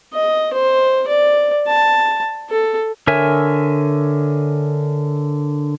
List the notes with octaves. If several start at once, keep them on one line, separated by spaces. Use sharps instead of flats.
D#5
C5
D5
A5
A4
D3 A#4 C#5 E5 G#5